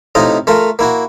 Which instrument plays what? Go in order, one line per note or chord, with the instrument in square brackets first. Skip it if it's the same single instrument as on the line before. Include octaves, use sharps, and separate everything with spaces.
[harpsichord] A2 C3 D#4 F4 D#5
A3 F4 A#4
A#3 E4 F#4